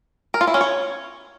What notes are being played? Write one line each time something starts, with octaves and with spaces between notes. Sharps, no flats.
A#4
F4
E4
C#4
C#5